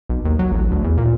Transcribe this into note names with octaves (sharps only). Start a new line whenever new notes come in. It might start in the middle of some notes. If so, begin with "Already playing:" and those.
B1
D#2
F#3
A1
D2
E2
A#2